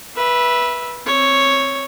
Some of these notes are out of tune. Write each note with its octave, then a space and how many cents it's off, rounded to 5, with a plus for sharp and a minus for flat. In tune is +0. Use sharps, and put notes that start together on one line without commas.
B4 -15 E5 +0
C4 +15 C#5 +0